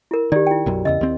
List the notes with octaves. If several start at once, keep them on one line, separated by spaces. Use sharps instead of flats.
E4 A#4
D#3 G4 D5
E4 G5
B1 F#2 F#3
E2 C#3 D#5 E6
D#2 C4